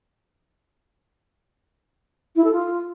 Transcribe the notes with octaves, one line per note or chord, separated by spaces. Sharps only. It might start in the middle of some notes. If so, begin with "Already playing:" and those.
E4
A4
F4